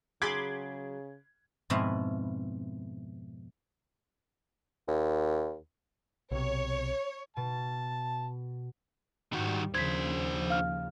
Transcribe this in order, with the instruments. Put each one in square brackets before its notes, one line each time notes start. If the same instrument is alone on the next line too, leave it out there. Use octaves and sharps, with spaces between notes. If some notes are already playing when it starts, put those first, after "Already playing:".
[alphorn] C#3 [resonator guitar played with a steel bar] F#3 G#4 [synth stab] B5 C6 D6 [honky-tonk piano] G#6
[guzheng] F2 G#2 B2 E4 B4 F5
[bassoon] D#2
[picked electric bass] B1 C3 [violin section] C#5
[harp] B2 [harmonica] A5
[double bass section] G#2 G3 [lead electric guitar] D#3 F#4
[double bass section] D#2 C#3 F3 [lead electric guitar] D4 C5 [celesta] G#6 B6
[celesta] F5 F6